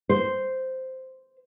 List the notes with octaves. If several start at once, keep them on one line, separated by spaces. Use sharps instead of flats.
C5